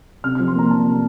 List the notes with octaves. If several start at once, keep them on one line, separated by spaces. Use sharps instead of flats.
C3 F6
F3 F6
C6
A#3 A#5
D4 A5
C3